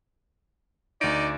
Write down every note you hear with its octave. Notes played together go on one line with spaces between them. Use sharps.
D2 D#4 D5 D7